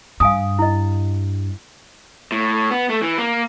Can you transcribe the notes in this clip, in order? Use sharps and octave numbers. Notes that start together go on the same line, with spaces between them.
G2 F5 G#5 D#6
E4 D#5
A2
B3
A3
E3
A#3